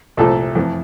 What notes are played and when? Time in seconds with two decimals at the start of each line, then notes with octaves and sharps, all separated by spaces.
0.17 C2 A#2 F3 A3 A4
0.55 F2 E3 A3